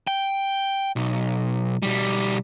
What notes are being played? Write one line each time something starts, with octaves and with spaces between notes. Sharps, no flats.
G5
B1
B2 G3